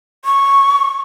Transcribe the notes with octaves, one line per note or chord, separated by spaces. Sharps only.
C#6